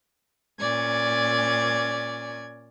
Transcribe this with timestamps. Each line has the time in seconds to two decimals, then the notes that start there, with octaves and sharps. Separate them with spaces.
0.59 A#2 C#4 D5 G#6